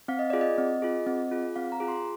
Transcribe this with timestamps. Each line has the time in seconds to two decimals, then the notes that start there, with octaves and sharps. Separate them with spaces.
0.08 C4 F5
0.19 D#5
0.30 F4 G#4 D5
0.41 D#5
0.58 C4
0.82 F4 G#4
1.07 C4
1.31 F4 G#4
1.56 C4 F5
1.72 A#5
1.80 F4 G#4
1.88 C6